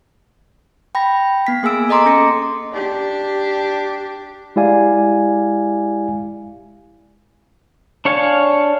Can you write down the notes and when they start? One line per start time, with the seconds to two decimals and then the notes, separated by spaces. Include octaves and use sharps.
0.95 G5 B5 A#6
1.47 B3 B6
1.63 A#3 G#4 G#5 E6 D7
1.89 A4 D#5 A#5 C6 D6
2.06 C#4 A#6 C#7
2.72 D4 G4
4.56 G#3 E4 G4 D5 F5 G#5
8.05 D4 C#5 F5 G#5